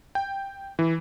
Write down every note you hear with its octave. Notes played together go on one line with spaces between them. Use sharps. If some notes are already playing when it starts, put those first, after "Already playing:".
G5
E3